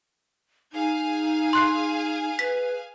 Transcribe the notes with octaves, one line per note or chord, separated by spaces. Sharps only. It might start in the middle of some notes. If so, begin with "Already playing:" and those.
D#4 G#4 F5 G#5
C6 F#6 C7
B4 B6